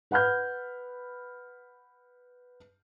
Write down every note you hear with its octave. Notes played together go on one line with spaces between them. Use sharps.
B4 F#5 B5 F6 G6